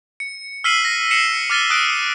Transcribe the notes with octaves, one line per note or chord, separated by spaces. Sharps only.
C#7
E6 F6 B6 C7 D#7 F#7
A#6
C7 C#7 E7 F#7
D6 F6 A6 D#7 G7
D#6 F#6 D7